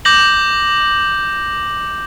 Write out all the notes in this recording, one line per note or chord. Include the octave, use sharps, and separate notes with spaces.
D6 G6 A#6 F#7